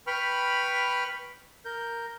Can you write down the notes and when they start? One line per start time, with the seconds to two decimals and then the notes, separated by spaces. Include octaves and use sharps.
0.07 B4 G5 B5 C#6 F6
1.65 A#4 G6